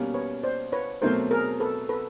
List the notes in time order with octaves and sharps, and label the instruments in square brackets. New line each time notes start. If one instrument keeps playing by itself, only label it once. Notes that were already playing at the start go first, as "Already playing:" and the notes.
Already playing: [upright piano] B2 G3 A#3 C#4
[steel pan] B4 C#5
C5 D5
B4 C#5
[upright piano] B2 F#3 A3 C4 [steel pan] A#4 C5
[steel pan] G#4 A#4
A4 B4
A4 B4